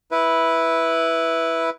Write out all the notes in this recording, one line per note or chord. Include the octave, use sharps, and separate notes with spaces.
E4 B4